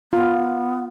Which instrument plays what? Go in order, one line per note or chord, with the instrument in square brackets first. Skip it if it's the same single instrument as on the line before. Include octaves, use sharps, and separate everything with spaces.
[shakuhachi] B3 [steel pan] F4